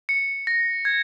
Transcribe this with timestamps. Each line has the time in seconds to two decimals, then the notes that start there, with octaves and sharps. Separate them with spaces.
0.09 C#7
0.47 A#6
0.85 G#6